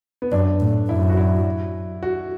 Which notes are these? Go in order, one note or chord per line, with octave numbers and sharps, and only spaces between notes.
B3
F#2 D4
A2
F#2 E4
F#4
E4
F#4